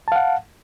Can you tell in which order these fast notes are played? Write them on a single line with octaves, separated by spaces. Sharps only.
A5 F5 F#5